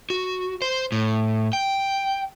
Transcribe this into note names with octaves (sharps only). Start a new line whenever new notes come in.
F#4
C5
A2
G5